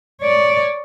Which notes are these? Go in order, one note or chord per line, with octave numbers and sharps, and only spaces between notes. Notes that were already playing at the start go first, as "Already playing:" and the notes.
C#5 D5